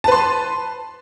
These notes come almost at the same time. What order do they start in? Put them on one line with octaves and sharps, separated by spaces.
A5 B4 C6